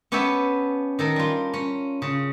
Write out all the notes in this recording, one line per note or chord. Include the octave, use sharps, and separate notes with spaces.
B3 C#4 G4 A4 C#5 E5
D#3 A4 A#4
G3 F4
C#4
C#3